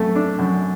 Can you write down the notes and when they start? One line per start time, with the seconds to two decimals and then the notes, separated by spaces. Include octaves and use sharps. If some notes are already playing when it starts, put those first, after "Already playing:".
Already playing: F#2 A3
0.15 D4
0.39 F#2